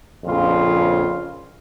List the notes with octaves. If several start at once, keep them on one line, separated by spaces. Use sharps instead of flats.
A#1 F2 C#3 F4